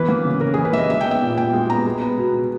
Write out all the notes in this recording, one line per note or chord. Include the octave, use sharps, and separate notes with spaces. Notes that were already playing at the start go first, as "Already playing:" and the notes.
Already playing: E3 B3 B4
A#3
C#3
C#3 A#4
G#4
E3
B4
A#3 E5
D#5
G#3 E5
B3 G5
E5
A#2
A#2 G5
G#3
B3 A#5
G#3
B3
B2
B2